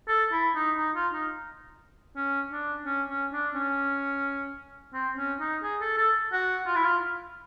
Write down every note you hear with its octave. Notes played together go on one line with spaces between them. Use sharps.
A4
E4
D#4
D#4
F4
D#4
C#4
D4
C#4
C#4
D4
C#4
C4
C#4
D#4
G#4
A4
A4
F#4
F4
E4
F4